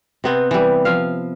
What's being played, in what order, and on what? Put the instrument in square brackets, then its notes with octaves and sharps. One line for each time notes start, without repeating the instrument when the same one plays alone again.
[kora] C3 B3 C4
E3 G3
F3 E5 F5